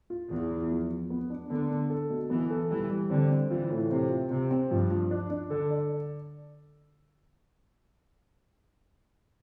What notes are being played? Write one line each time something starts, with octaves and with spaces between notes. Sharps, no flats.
F4
E2 B3
E4
F3
F3
B3
D4
D3 B3
B3
A4
B2
E3 B3
A4
E3 G3
G3
D3 C4
C4
E3 F4
A2
C3 C4
F4
C3 C4
C4
G2 F3
F3
D4
D4
D3 A4
D5